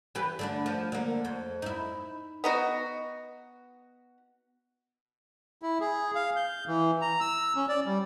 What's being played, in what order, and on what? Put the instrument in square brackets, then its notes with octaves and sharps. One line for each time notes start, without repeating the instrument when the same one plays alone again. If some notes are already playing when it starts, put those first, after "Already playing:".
[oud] E3 G4 B4
D3 A3 D4
F3
D3 A#3
F2
D#4 E4
[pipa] B3 D#4 F#4
[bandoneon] E4
G#4
F5
G6
E3
A#5
E6
C#4
D5
G3